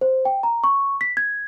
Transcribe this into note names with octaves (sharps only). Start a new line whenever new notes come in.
C5
G5
A#5
C#6
B6
G#6